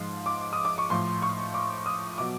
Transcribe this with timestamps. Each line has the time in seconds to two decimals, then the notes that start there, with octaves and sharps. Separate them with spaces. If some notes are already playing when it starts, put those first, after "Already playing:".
Already playing: G#2 F3 C6
0.26 D6
0.53 D#6
0.65 D6
0.78 C#6
0.90 A2 F3 C6
1.22 C#6
1.54 D6
1.86 D#6
2.18 B2 F#3 D6